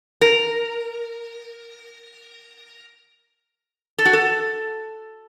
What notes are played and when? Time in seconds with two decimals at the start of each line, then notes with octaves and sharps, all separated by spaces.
0.21 A#4
3.98 A4
4.05 F#4
4.13 A4